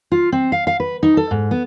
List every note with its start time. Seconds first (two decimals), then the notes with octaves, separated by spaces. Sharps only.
0.12 F4
0.32 C4
0.52 F5
0.67 F5
0.80 B4
1.03 D#4
1.17 A4
1.31 G#2
1.51 B3